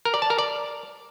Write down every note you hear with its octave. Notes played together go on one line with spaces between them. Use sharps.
A#4
D5
A5
A#4
D5